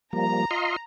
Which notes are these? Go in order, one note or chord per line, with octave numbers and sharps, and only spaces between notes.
F3 G3 A#3 A#5
F4 D#5 C6